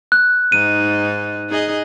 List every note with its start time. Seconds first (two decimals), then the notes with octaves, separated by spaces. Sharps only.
0.12 F#6
0.52 G#2 D#4 D#7
1.49 D#4 G#4 D#5